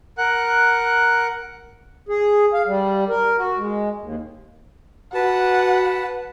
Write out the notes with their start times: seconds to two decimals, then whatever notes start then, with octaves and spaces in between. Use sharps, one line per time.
0.18 A#4 F#5 F#6
2.09 G#4
2.54 F5
2.67 G3
3.09 A#4
3.38 F#4
3.58 G#3
4.02 D#2
5.14 F#4 B4 F#5 A5